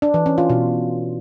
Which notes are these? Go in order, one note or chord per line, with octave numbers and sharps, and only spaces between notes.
D4
E3
C#4
F4
B2